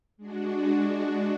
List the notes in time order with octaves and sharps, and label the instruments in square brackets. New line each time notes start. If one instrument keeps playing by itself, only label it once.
[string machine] G#3 D4 F#4